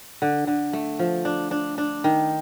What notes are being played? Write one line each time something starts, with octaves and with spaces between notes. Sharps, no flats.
D3
D3
A3
F3
D4
D4
D4
D#3